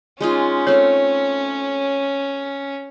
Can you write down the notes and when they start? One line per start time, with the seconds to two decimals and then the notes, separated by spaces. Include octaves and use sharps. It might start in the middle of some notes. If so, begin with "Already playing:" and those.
0.21 G#3 C#4 D#4 F4
0.67 A3 C4 C#5 F5